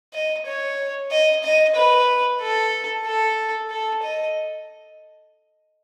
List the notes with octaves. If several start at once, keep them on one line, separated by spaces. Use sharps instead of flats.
D#5
C#5
D#5
D#5
B4
A4
A4
A4
D#5